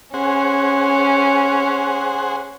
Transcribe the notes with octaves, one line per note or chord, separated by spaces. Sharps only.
C#4 G#4 C5 F#5